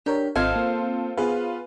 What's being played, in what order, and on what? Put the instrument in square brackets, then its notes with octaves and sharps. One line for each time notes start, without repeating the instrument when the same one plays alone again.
[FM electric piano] D4 A#4 C#5 [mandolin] G4
[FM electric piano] G#1 D#5 G#6 [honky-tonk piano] C4 F4 A4 [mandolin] C5 F5
[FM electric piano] A#3
[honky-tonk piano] B3 F4 [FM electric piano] G#4 B4